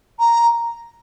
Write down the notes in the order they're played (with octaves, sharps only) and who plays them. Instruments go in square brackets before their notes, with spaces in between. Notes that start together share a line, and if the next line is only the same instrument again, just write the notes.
[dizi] A#5